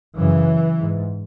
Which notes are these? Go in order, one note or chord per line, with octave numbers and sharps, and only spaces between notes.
F#2 C#3 E3
G#2